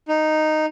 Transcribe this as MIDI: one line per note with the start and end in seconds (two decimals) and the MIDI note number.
0.08 0.66 63